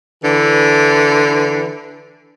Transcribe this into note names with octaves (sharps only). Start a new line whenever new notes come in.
D3 E3